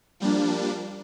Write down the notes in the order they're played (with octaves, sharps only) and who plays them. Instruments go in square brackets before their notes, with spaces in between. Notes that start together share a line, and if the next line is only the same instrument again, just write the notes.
[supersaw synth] F3 G3 A#3 D4